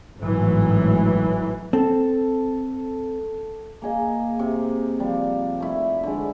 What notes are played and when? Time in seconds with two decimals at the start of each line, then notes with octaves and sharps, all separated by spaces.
0.18 G#1 A2 E3 F#3
1.73 C4 A4
3.82 A#3 G#4 D#5
4.39 C3
4.99 F3 G3
5.60 A3 E4
6.03 D3 G#3